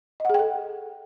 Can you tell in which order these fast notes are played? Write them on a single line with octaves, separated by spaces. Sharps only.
D#5 F#5 G#4 G5 A4